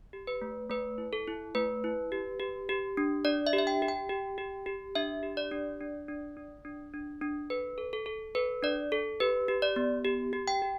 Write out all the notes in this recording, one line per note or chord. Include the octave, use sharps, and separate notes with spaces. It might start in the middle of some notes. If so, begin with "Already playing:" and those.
G4
B4
A3
A3 B4
E4
A4
E4
A3 B4
E4
G4
G4
G4
D4
D4 D5
E5
G4
E5
G5
G4
G5
G4
G4
G4
D4 E5
G4
D5
D4
D4
D4
D4
D4
D4
D4
A4 B4
A4
A4
A4
A4 B4
D4 D5
A4
G4 B4
G4
D5
B3
G4
G4
G5
G4